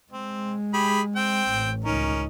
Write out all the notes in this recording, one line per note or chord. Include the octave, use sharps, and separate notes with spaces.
G#3 C4
G4 G#4 B5
C4 G5
A1
C#2 C#4 D#4 A#4